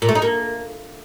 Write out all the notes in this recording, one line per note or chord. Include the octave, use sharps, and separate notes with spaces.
A#2
A3
D#4
A#3